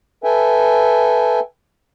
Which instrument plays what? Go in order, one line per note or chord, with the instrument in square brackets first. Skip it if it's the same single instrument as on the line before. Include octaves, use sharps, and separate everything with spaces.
[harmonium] A4 B4 E5 G5 G#5